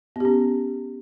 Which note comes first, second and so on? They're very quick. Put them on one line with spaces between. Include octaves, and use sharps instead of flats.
B3 G4 C#4